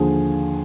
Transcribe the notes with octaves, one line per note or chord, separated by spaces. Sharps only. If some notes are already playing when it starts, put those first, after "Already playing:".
Already playing: D#2 D3 F3 G#4